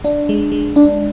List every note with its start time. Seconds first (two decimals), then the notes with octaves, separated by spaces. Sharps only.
0.04 D4
0.29 G#3
0.52 G#3
0.76 D4